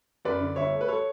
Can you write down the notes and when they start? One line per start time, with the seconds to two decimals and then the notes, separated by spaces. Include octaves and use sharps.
0.25 F#2 B4 D5
0.40 D3
0.56 G1 C#5 E5
0.73 A3
0.81 B4
0.88 A4 C#5